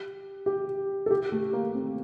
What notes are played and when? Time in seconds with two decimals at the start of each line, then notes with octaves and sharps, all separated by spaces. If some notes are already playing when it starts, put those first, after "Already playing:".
Already playing: G4
0.46 G4
1.06 A4
1.11 G4
1.32 A3
1.53 A#3
1.74 C4